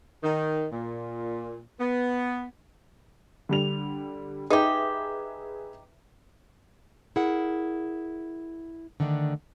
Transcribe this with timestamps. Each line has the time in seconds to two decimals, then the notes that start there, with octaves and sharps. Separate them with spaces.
0.23 D#3
0.72 A#2
1.80 B3
3.49 D3 G3 F7
4.50 D#4 G4 G#4 B4 E5
7.16 E4 G#4 A#4 F#5
9.00 D3 D#3 A3 D4